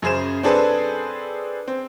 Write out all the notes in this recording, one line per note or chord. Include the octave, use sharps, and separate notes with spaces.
F#2 C#3 G#4 C5 E7
C4 D4 G#4 A4 B4 C5
C4